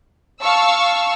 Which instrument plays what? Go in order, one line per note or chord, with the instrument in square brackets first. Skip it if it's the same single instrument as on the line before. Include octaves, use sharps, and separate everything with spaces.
[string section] F5 A5 C#6 E6